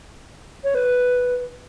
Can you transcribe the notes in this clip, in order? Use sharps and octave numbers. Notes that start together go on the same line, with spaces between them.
C#5
B4